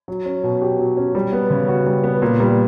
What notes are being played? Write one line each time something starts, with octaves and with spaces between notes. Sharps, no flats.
F#3
C#4
B2
G4
F#3
C#4
G3
B3
C#3
F#4
G3
B3
A#2
G3